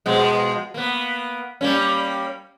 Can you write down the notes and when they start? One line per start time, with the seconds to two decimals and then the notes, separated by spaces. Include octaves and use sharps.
0.06 B2 F3 G#3
0.74 A#3 B3
1.61 G3 A#3 C#4